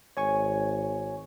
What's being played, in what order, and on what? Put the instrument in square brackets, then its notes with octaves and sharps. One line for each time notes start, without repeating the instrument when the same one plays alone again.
[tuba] G#1 [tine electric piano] C#5 G#5 C#6